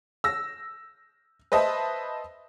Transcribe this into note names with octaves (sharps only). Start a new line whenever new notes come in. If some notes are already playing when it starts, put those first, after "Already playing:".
E6 A#6
B4 C5 D#5 E5 A5